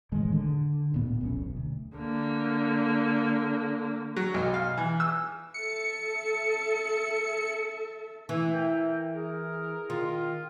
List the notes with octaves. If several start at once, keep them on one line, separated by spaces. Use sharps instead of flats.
E1 A1 D#3 G#3
D3
D1 A#2 B3
E1 B1 C#4
D2
D3 A#3
F#3
B1
F5
E3
E6
A4 E5 C#7
E3 A3 E4 E5
A#4 E5 G5
G#4 A#4
D#3 F4